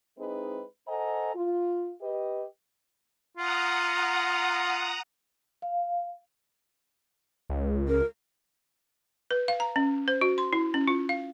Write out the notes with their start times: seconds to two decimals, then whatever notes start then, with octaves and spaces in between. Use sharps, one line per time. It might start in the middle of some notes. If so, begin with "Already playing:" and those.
0.19 G#3 C4 D#4 E4 G#4 B4
0.88 A4 C5 D#5 F#5 G#5 A#5
1.35 F4
2.01 G4 B4 D#5
3.37 F4 F#5 A#5 D#6
5.62 F5
7.49 C#2
7.88 A#4
9.31 B4
9.48 F5
9.60 A#5
9.76 C#4
10.08 C5
10.21 F#4
10.38 C6
10.53 E4
10.74 C#4
10.88 F4
11.09 F5